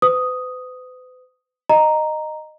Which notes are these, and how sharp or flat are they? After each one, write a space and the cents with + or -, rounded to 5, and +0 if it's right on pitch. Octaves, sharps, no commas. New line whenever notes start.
B4 +45 D#6 +0
D#5 -15 A#5 +0